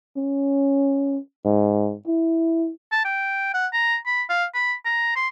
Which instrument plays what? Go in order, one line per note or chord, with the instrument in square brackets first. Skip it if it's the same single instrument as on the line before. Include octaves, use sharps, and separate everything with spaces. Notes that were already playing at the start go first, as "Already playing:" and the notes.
[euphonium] C#4
G#2
E4
[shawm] A5
G5
F#5
A#5
B5
F5
B5
A#5
C6